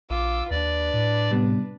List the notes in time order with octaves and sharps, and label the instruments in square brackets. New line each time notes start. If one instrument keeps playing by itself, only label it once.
[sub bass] A#1 [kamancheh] F4 D6 [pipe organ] E6
[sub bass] D#2 [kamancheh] D4 B4 [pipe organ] D5
[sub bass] A2
[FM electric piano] C3 G3 B3